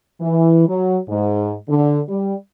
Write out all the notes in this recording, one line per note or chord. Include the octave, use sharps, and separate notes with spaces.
E3
F#3
G#2
D3
G3